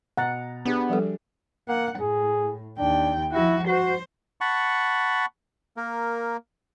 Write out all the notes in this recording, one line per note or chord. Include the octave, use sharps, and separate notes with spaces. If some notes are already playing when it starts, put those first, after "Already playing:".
B2 F#5 A#5 A6
B3 D4 G4 G#4
F3 G3 A4
A#3 F#5
A2 G#4
D#2 D4 G5
F3 E4 F#4
F#4 C5
F#5 A5 B5 C#6
A#3 A#4